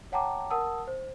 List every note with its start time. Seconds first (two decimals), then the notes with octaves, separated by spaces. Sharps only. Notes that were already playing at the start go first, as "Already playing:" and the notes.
0.12 C#5 F#5 G5 A5 A#5 D6
0.50 A#4 F#5 A5 D#6 E6
0.87 C5